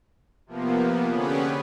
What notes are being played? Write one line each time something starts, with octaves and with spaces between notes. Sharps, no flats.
C3 F3 A#3 B3
D3 B3 C#4 G4 G#4 B4